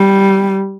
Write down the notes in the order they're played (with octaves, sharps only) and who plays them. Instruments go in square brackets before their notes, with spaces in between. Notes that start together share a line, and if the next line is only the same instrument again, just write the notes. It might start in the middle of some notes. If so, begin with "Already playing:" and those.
Already playing: [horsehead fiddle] G3